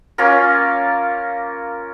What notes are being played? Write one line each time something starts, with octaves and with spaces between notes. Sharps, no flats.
A#3 C#4 F4 A#4